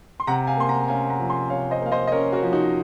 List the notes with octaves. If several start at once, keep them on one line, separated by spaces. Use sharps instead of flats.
C6
C3 F#5 A#5
F5 G#5
A#3 C6
F#5 A#5
C#4 F5 G#5
F#5 A#5
F3
G#5 C6
C3 C#5 F5
C5 D#5
A#3 F5
C5 D#5
D#5
C#4 A#4 C#5
F#4 A#4
F3
D#4 F#4